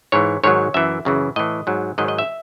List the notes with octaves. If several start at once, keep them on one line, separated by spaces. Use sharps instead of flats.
G#2 E3 C#5
G#2 D#3 F#3 C#5
F#2 E3 E5
F#2 C#3 E3
A2 E3 D#5
G#2 F#3
G#2 D#3 F#3 D#5
D#5
E5